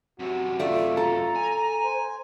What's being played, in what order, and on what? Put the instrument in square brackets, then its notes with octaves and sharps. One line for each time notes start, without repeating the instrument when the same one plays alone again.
[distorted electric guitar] F#2 C3 [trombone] F#4
[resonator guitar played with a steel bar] A3 D5 [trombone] F4
[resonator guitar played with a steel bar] A4 [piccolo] A#5
[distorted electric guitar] G#5
[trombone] C5